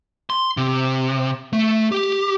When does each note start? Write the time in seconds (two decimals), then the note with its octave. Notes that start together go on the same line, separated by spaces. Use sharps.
0.30 C6
0.57 C3
1.53 A3
1.92 G4